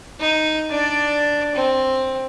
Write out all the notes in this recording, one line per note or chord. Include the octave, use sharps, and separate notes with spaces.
D#4
D4 D5
C4